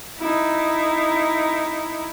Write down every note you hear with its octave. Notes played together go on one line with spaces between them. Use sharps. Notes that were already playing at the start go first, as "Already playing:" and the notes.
D#4 E4